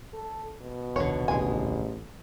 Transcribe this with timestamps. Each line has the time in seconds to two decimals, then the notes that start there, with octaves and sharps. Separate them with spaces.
0.14 A4
0.62 B2
0.96 D#1 C2 D3 C#5
1.28 A1 G#3 G#5